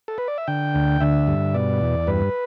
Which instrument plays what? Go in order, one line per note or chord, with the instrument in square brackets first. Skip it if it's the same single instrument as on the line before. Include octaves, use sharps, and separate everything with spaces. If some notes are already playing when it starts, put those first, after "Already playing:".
[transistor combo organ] A4
B4
D5
E5
D3 G5
D2
D3 E5
G2
B2 D5
E2
G2 B4